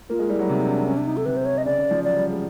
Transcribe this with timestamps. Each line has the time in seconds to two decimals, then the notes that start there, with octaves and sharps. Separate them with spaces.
0.10 A#3 F4
0.19 G#3
0.29 G3 E4
0.39 F#3
0.48 C3 D#4
0.68 D4
0.87 C#4
0.97 D4
1.07 D#4
1.17 A4
1.26 C3 B4
1.37 C5
1.45 C#5
1.58 D#5
1.65 C#3 D5
1.78 C#3
1.91 F3
2.04 F#3 D5
2.17 G3
2.30 G#3